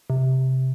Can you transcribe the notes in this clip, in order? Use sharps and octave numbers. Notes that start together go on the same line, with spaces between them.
C3